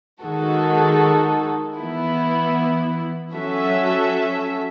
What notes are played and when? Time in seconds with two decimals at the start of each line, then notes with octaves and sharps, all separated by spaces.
0.23 D#3 G#3 D#4 F#4 A4
1.77 E3 B3 E4
3.32 F#3 C#4 F#4 A4 E5